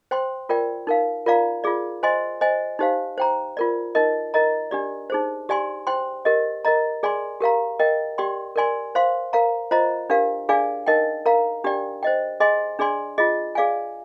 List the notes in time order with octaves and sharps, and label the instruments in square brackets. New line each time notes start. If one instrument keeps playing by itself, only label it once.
[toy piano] C5 G5 C6
F4 A#4 D5 G5
D#4 A#4 F5
F4 A#4 D5 F5 A#5
F4 G#4 D5
C5 D#5 G#5 C6
C5 D#5 G#5
D#4 G4 C5 F5
C5 G5 A#5
F4 A#4 D5
D#4 A#4 D#5
A#4 D#5 A#5
D4 G4 D5
D#4 G#4 C5
G4 D5 G#5 C6
C5 G5 C6
G4 A#4 D#5
A#4 D#5 A#5
G#4 D5 G#5 C6
G4 A#4 F5 A#5
A#4 D#5 G5
G4 D5 G5 C6
A#4 D5 G#5 C6
C5 F5 C6
A#4 F5 A#5
F4 C5 D#5 A#5
D4 G4 A#4 F5
D4 G#4 D5 F5 G#5
D#4 A#4 D#5 G5
A#4 F5 A#5
D4 G4 D5 G5
C5 D#5 G5
G#4 D#5 G#5 C6
D4 G#4 D5 G#5 C6
F4 G#4 D#5
G#4 D5 F5 G#5